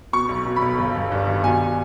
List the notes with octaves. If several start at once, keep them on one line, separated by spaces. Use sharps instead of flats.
B2 C#6
B1
B2
B5
B1
G1
G1
G2
D#3
B2 G#5